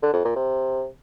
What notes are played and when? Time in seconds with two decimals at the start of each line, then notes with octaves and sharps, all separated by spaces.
0.02 D3
0.13 F2
0.25 A#2
0.36 C3